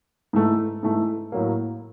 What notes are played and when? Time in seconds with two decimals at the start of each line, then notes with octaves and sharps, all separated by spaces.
0.33 G#2 E3 A3
0.83 G#2 E3 A3
1.32 A2 F#3 A#3